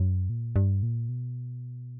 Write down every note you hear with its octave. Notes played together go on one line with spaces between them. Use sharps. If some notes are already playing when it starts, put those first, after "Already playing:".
Already playing: F#2
A#2
G2
A#2
B2